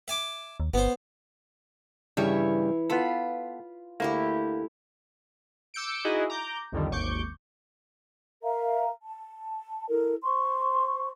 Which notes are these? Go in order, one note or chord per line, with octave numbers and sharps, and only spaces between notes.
E5 G#5 D6
D#2
G1 B3 C5
G2 C#3 E3 G3 C#5 E5
B3 F4 A4 B5
D2 A3 A#3 E4 G4
D6 E6 G6 C#7 D7
D#4 E4 F#4 G#4 D#5
A#5 D6 G6
C2 F2 D3 D#3 G3
G#1 D#2 C#6 D6 G6
A#4 E5 F5 A#5
A5
E4 A4 A#4
C5 C6 C#6